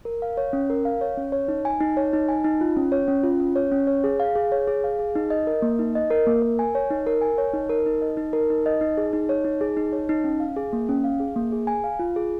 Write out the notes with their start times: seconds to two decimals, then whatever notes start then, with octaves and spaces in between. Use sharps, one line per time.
0.05 A#4
0.22 F5
0.37 C#5
0.53 C#4
0.70 A#4
0.85 F5
1.01 C#5
1.17 C#4
1.32 C#5
1.48 D#4
1.65 G#5
1.80 D#4
1.97 C#5
2.13 D#4
2.29 G#5
2.44 D#4
2.61 F4
2.76 C#4
2.92 C#5
3.08 C#4
3.24 F4
3.40 C#4
3.56 C#5
3.72 C#4
3.87 C#5
4.04 G#4
4.20 F5
4.35 G#4
4.52 C#5
4.67 G#4
4.84 F5
4.99 G#4
5.16 D#4
5.30 D#5
5.47 A#4
5.62 A#3
5.79 D#4
5.95 D#5
6.10 A#4
6.26 A#3
6.42 A#4
6.59 G#5
6.75 C#5
6.90 D#4
7.07 A#4
7.22 G#5
7.38 C#5
7.53 D#4
7.70 A#4
7.86 D#4
8.02 D#5
8.17 D#4
8.33 A#4
8.50 D#4
8.66 D#5
8.81 D#4
8.97 G#4
9.13 D#4
9.29 C#5
9.45 D#4
9.61 G#4
9.77 D#4
9.92 C#5
10.09 D#4
10.24 C#4
10.40 F5
10.56 G#4
10.73 A#3
10.89 C#4
11.04 F5
11.20 G#4
11.36 A#3
11.52 G#4
11.67 G#5
11.84 F5
11.99 F4
12.16 G#4